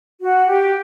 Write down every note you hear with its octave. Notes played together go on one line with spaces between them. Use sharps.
F#4
G4